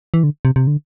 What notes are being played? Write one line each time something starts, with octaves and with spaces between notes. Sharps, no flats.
E3
D3
C3
C3
D3